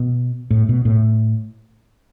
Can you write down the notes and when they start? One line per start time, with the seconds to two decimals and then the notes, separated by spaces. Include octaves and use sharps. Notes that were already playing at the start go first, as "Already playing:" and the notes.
Already playing: B2
0.51 A2
0.69 B2
0.85 A2